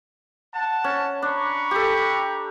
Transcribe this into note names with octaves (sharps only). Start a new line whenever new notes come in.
F#5 A5
C#4
D4 A#5 B5 C#6
G4 A4